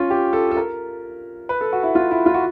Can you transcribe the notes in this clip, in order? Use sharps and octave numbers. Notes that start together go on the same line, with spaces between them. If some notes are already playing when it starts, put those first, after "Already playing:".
Already playing: C#4 F4
G4
A4
A4
A#4
B4
A4
F#4
E4
F4
E4
F4
F#4